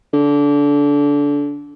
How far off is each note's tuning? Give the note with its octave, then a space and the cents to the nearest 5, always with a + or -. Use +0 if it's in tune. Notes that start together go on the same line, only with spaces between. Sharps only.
D3 -25